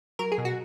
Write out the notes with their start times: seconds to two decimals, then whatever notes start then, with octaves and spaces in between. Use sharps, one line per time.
0.19 F#3 A#4
0.32 G#4
0.38 B2
0.45 F#4